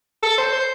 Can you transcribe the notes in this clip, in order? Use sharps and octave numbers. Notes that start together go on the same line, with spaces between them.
A4
C5
C5